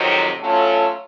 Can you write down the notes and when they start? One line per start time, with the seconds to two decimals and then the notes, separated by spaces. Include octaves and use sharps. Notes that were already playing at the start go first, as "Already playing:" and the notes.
Already playing: F2 C3 D#3 F#3
0.40 F#3 A3 C#4 F4 A4